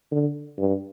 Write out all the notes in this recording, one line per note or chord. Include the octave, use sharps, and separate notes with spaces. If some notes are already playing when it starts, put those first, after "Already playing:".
D3
G2